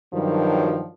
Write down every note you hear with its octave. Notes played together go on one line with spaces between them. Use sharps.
G2 D#3 F3 F#3